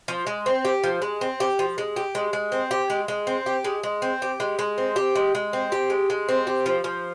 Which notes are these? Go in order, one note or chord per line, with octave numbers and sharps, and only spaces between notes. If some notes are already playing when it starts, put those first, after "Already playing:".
F3
G#3
C4
G4
F3
G#3
C4
G4
F3
G#3
G4
G#3
G#3
C4
G4
G#3
G#3
C4
G4
G#3
G#3
C4
G4
G#3
G#3
C4
G4
G#3
G#3
C4
G4
G#3
G#3
C4
G4
F3
F3